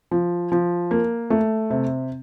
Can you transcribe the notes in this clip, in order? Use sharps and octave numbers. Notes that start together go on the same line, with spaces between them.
F3
F3
A#3
A3
C3